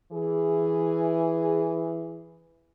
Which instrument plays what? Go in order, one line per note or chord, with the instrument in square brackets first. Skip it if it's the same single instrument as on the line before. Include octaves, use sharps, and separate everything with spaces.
[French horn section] E3 G#4